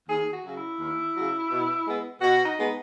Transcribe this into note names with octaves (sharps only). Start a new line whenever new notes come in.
D#2 G#4
F#4
C#3 F#3
E4
D#2
C#3 F#3
B2
G#3 B3
B2 F#4
D#4
G#3 B3